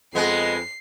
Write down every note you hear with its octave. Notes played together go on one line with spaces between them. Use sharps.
F2 G#3 B3 D#5 C7